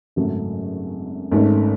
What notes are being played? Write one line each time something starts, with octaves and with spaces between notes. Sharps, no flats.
G#1 F#2 C#3 F#3 A3
G#1 G#2 D#3 A3 C#4